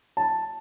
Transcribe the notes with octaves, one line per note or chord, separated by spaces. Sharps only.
A5